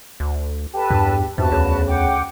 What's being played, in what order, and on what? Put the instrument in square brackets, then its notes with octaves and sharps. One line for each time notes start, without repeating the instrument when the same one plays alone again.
[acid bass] D2
[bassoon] G4 [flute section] A4 B4 A5
[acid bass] E2 [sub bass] G2
[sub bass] E2 [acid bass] G2 [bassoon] C3 [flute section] F#4 B4 A5
[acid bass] D2 [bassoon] C#3
[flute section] F#5 G5 D6